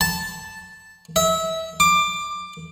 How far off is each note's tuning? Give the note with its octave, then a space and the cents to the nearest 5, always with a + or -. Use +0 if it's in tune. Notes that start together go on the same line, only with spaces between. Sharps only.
A5 -5
E5 -25
D6 +15